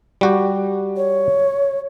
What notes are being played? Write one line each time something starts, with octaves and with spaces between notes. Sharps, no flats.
G3 F#4 G4
C#5